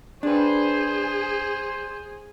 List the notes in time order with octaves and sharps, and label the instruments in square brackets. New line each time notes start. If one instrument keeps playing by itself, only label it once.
[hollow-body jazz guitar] D4 B4 [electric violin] G#4 [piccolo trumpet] C5